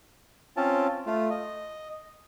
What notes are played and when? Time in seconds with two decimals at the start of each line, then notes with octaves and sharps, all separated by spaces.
0.57 C4 C#4 F4 A5
1.06 A3 F4
1.30 D#5